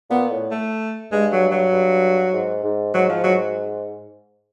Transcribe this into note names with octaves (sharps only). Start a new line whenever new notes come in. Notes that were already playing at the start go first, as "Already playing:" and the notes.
A#2 B3
A2
A3
G2 G#3
F#3
F#3
G2
G#2
G#2
G#2 F#3
F3
F#3